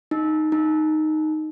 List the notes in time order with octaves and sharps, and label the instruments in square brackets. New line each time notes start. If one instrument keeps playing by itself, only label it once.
[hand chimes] D#4
D#4